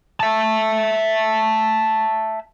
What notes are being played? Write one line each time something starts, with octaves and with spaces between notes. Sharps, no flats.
E5 A5